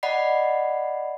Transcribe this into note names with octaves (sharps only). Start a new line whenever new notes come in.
D5 D#5 F#5 B5 C7